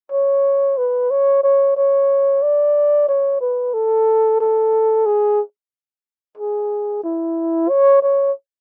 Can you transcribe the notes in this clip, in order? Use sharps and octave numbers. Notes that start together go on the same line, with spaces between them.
C#5
B4
C#5
C#5
C#5
D5
C#5
B4
A4
A4
G#4
G#4
E4
C#5
C#5